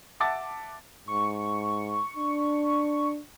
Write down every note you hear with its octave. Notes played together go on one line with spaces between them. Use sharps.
E5 F#5 A5 D6 E6 A6
G#2 C#6
D4